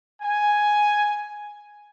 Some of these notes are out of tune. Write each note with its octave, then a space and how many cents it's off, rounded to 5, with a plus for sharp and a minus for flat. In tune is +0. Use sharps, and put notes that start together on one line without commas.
G#5 +0